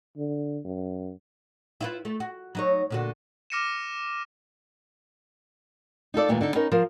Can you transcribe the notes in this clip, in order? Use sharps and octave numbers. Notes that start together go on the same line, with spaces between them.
D3
F#2
E4 F4 B4
A3
F#4
F#3 D#4 C#5
A#2 D3 F#4
D6 F6 A#6 C#7 D#7 E7
D#4 F4 A4 D5
D#2 A#2 E3 G#3 A3
D3 D#4 A4
B3 C#4 D#4 A#4
F3 A#4 C5